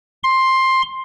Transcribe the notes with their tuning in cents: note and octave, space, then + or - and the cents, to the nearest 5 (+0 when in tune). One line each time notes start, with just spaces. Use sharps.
C6 +10